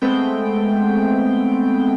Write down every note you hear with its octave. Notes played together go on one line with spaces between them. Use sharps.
G#3 A3 B3 C4 G5